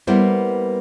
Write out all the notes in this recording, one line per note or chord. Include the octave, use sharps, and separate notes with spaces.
G3 A#3 B3 E4 C5